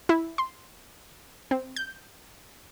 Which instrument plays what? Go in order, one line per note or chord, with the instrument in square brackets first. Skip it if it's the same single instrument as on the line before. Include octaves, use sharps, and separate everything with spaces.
[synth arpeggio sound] E4
C6
C4
G6